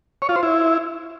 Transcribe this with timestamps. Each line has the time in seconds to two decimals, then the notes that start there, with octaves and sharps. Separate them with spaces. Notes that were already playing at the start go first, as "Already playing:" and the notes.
0.22 C#5
0.29 F4
0.36 C5
0.43 E4